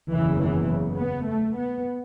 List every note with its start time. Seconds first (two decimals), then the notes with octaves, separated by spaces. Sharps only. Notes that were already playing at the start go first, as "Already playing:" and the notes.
0.11 F#1 E2 C#3 E3
0.41 E3
0.69 C#3
0.99 B3
1.27 A3
1.57 B3